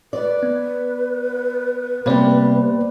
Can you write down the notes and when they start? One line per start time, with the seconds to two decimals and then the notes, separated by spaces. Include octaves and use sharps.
0.13 B4 D5
0.43 B3
2.06 C3 G3 A#3 B3 C5 D5